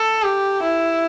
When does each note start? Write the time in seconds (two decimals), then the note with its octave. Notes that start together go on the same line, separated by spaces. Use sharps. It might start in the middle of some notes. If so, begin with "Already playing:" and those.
Already playing: A4
0.23 G4
0.62 E4